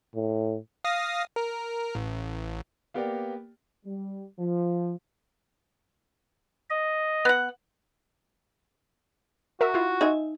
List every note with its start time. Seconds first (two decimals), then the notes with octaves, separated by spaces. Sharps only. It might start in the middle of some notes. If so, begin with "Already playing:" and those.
0.16 A2
0.84 F5 D#6 A#6
1.36 A#4
1.95 A1
2.94 A#3 B3 G4 A#4 D5 G5
3.85 G3
4.39 F3
6.70 D#5
7.25 B3 F#5
9.61 F#4 A#4 E5
9.74 E4 F4
10.01 D#4 E5 G#5